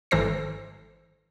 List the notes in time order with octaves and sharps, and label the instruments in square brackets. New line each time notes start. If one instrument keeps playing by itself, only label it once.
[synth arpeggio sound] G#1 E3 A4 C5 A#6 C7